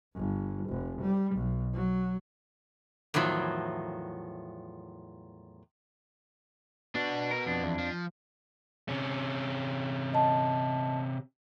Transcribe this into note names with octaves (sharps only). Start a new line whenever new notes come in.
G1
F1
G3
B1
F#3
E2 A2 D#3 F3 F#3
B3 D4 F#4
A#4
F2 D4
E2
F3
C3 C#4
D#5 A5